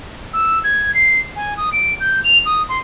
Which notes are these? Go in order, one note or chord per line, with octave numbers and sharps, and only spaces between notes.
E6
G#6
C7
G#5
D#6
D7
G6
F7
D#6
C6